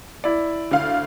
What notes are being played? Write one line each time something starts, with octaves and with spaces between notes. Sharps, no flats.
E4 D5
D2 F5